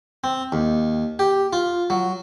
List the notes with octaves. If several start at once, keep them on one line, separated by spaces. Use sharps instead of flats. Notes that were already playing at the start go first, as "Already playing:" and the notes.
C4
D#2
G4
F4
F#3